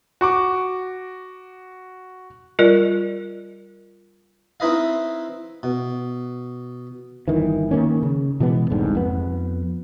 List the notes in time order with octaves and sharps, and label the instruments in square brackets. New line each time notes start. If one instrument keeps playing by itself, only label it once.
[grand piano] F#4 C#6 D6
[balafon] G3 F4 A#4 D5
[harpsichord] C4 D#4 E4 B4 D#5 F5
B2
[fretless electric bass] G1 D#3 E3
D#3 E3 A#3 C#4
C#3
B2 E3 G#3 B3
E1 C2 G#2 D3
F2 B3